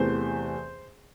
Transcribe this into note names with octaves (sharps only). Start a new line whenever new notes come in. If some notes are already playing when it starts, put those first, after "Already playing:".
Already playing: E2 C3 E3 A3 C5